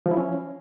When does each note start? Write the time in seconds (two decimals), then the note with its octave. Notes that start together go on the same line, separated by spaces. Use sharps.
0.06 F3
0.11 E4
0.17 C#4